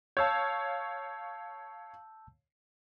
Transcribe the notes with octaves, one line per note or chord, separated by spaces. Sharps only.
C#5 F5 A5 E6 G6